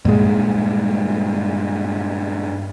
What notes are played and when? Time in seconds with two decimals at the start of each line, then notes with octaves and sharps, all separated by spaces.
0.05 G2 A#2 G#3